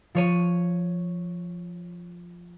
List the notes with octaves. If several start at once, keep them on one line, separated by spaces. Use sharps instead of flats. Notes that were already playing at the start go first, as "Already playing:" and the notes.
F3 C#5 D#7